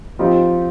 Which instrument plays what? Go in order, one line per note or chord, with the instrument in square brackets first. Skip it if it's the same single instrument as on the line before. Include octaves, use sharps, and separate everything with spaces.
[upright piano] F3 C4 D#4 G4 [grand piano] F4